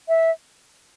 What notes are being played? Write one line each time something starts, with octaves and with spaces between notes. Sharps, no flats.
E5